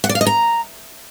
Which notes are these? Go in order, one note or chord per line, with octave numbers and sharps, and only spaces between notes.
F#5
D5
F5
D#5
A#5